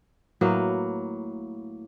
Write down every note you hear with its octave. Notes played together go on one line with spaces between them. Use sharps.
A2 F#3 A#3 B4